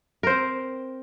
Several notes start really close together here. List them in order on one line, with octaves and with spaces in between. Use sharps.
A#4 C5 C4